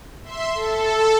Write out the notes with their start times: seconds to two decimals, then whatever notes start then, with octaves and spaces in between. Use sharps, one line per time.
0.24 E5 C6
0.55 A4